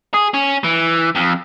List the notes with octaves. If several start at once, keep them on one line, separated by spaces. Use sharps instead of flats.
G#4
C#4
E3
F2